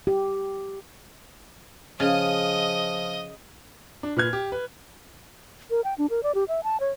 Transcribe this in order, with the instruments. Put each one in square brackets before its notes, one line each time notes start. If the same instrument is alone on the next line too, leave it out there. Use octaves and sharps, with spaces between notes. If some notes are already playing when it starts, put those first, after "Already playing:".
[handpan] G4
[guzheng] C#3 [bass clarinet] F3 [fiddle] D#5 D#6 [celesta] F5 F6
[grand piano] D4
A#2 B4 F6 G#6
G4
B4
[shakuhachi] A#4
G5
D4
A#4
D5
G4
E5
A5
C#5